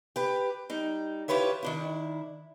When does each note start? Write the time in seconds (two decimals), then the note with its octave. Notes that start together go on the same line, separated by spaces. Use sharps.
0.16 G4 B4
0.70 G3 D#4
1.28 E4 F4 G4 B4 C#5 E5
1.63 D#3 D4 E4